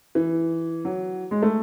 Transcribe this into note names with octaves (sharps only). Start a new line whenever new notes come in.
E3
F#3
G#3
A3